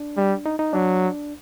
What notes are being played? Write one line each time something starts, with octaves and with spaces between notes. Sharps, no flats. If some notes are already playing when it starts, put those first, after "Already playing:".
Already playing: D4
G3
D#4
D#4
F#3 D4